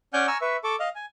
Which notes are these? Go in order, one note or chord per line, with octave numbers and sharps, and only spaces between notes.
C#4 D5 F#5 G#5 F6 G6
G#5 A#5 C#6 E6 F6
B4 E5 C#6
A4 C#6 D6
D#5 F5
G#5